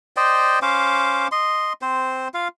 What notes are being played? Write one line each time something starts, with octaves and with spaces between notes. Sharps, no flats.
C5 D5 D#5 G5
C#4 C5 F5 D6
D#5 C6
C4 C5
F4 F5